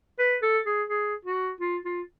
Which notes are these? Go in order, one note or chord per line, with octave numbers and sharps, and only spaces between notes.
B4
A4
G#4
G#4
F#4
F4
F4